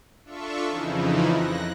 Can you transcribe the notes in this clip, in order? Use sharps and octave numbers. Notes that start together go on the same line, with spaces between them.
D4 F4 A4 E5 C#6
F2 C#3 E3 F3 D#4 E4
F#6 A#6